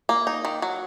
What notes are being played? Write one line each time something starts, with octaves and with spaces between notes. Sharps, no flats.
A#3
D#4
D#3
F#3